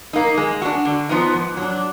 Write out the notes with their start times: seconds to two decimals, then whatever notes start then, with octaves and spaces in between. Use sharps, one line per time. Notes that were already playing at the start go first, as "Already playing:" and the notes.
0.13 A#3 D#4
0.37 G#3
0.62 D4 F#4
0.85 D3
1.09 F3 B3 D#4
1.33 G#2
1.57 F#3 D4